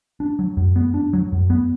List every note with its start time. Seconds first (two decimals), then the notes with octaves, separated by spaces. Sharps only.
0.20 D4
0.39 F#3
0.57 F#2
0.76 B3
0.94 D4
1.13 F#3
1.32 F#2
1.50 B3